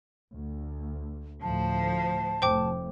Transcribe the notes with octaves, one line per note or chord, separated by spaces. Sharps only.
D2
D2 A2 F3 C5 A5
F1 A2 C5 G5 D6